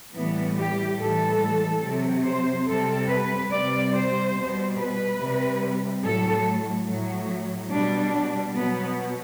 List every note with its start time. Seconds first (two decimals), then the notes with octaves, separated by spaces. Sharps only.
0.15 A2 E3 G3 B3
0.58 G4
0.99 A2 E3 G3 A4
1.84 C3 F#3
2.26 C5
2.68 C3 G3 A4
3.10 B4
3.51 C3 G3 D5
3.94 C5
4.36 B2 G3
4.78 B4
5.20 C3 G3
6.04 A2 F#3 A4
6.88 A2 F#3
7.72 B2 G3 D4
8.57 B2 F#3 B3